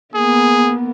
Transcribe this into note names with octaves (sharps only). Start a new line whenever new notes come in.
A#3 B3 G#4